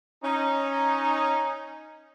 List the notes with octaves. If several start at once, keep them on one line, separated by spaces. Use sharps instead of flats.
C#4 D#4